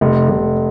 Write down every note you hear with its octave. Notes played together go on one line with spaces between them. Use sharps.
F1
F1